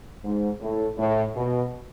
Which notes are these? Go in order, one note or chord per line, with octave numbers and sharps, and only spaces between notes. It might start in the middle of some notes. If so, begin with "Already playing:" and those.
G#2
A2
A2
B2